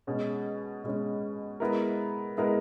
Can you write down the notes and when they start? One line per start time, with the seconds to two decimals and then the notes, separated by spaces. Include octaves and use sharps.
0.07 B2 G#3 C#4
0.84 B2 G#3 C#4
1.60 G#3 B3 E4 A#4
2.38 G#3 B3 E4 A#4